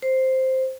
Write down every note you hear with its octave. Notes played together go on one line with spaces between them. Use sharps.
C5